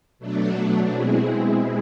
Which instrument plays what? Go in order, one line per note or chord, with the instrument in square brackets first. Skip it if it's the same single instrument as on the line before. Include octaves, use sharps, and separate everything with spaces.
[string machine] B2 F#3 A3 D4
B2 G#3 C4 E4 G#4